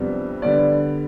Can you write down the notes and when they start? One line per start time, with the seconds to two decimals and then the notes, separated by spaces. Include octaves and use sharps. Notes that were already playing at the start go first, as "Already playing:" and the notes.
Already playing: F2 C3 G3 B3 D4
0.42 D3 G3 B3 D5